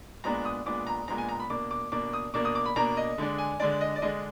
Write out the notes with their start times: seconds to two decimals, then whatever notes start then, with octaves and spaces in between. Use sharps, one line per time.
0.24 A#2 G#3 B3 D4 A#5
0.45 D#6
0.66 A#2 G#3 B3 D4 D6
0.87 A#5
1.08 A#2 G#3 B3 D4 A#5
1.18 G#5
1.29 A#5
1.39 B5
1.50 B2 A#3 D4 D6
1.71 D6
1.92 B2 A#3 D4 D6
2.13 D#6
2.34 B2 A#3 D4 D6
2.45 D#6
2.55 D6
2.66 B5
2.76 B2 A#3 D4 A#5
2.97 D#5
3.18 D3 G#3 D4
3.38 G#5
3.60 D3 G#3 D4 D5
3.81 D#5
3.95 D5
4.02 D3 G#3 D4 D#5